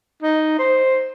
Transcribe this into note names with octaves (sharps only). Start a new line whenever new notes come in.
D#4
C5